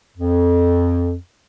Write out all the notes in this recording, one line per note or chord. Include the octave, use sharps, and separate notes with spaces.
F2